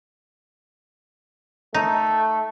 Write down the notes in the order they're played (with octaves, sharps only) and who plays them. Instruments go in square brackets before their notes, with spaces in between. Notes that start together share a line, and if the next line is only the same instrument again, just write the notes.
[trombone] A3 [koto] D#4